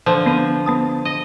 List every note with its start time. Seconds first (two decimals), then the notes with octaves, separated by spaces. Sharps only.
0.06 D3 F3
0.26 B3 D#7
0.66 B3 A5 D#6
1.05 D#5